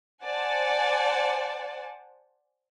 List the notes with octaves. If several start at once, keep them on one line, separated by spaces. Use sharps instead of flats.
C5 D5 F#5 G#5 A5